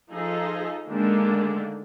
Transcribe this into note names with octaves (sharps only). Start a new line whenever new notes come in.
F3 D#4 G#4 A4 D#5
D3 D#3 G#3 A#3 D4